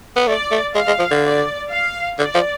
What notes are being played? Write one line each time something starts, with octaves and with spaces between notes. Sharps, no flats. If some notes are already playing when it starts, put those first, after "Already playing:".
B3
A3 D5
A3
G#3 F5
G#3
F3
D3
D5
F5
D3 D5
F3